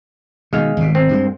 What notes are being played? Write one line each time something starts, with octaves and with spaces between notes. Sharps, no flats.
B2 D#3 G#3 F5
G#1 B2
C4
G2 G3 G#3